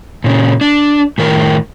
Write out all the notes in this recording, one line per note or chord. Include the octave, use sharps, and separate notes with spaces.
A#2 C#3
D4
A2 D#3 A#4